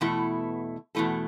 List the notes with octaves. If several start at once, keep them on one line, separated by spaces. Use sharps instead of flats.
E2 B2 A3 E4 A4
E2 B2 A3 E4 A4